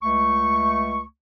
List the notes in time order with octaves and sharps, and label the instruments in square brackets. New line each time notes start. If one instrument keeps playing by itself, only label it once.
[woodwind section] C#2 A3 C#6